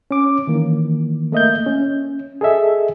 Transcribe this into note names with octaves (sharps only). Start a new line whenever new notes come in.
C#4 D6
D#3 E3 A#3
A3 A#3 D#5 E5 G6
C#4
G#4 A4 D#5 E5